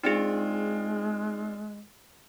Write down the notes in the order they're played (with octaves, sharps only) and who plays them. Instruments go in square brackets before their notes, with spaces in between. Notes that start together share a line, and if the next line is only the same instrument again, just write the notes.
[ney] G#3 [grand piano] C4 D4 F4 [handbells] D#4 G#4